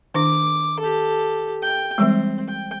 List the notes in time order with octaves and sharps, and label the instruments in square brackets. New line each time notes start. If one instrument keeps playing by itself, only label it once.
[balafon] D#3 D4 [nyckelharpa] D6
[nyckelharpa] G4 A4
G5
[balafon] E3 G3 G#3 [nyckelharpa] C4
[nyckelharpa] G5